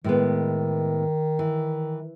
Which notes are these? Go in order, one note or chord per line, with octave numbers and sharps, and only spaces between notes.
A2 D#3 G#3 B3
E3